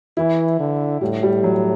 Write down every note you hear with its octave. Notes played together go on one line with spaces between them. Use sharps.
E3 E4
D3
A2 G3
G3
F#3